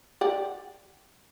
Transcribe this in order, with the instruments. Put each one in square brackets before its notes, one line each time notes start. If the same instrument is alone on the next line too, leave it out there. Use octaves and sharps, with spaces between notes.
[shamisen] D5 F#5 G5